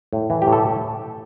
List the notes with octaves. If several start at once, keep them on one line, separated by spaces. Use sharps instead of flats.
A2
E3
G4
A2
A4